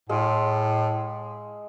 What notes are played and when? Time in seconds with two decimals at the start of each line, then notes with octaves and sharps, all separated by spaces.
0.09 A2 G#3 D#5 F5